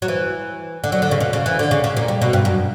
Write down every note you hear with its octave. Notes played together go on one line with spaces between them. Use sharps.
F#3
E3
D3
F#3
D3
C#3
B2
C#3
E3
D3
C#3
C#3
A#2
G3
B2
G2
F#2